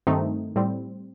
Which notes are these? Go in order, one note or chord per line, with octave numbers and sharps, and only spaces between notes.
G2 D#3 A3 C4 D#4
A2 G3 C4